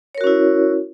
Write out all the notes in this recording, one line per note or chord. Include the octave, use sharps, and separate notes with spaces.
C#4 E4 F#4 A#4 C#5